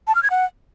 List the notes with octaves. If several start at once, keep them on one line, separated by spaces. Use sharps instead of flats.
A5
F6
G#6
F#5